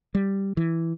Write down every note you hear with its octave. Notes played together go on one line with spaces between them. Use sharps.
G3
E3